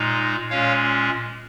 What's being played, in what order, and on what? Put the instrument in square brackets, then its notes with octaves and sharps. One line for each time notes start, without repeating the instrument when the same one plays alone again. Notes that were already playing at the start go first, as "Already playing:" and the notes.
Already playing: [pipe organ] A#2 G#3 D#4
A#2 G#3 C#4 C#5 F5